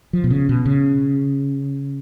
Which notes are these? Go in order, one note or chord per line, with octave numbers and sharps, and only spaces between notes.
F3
B2
C#3
B2
C#3